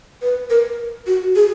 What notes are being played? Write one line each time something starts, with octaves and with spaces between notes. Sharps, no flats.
B4
A#4
F#4
G#4